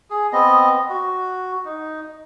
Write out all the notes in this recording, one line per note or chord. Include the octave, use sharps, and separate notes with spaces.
G#4
B3 C4 D#5
F#4
D#4